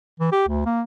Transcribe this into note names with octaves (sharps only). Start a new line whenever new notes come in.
E3
G4
D2
A#3